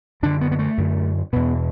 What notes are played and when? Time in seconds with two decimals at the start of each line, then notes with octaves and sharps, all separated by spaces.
0.23 F#2 D3 D4
0.41 B3
0.52 B3
0.59 A3
0.78 F#2 D3
1.33 E2 B2 B3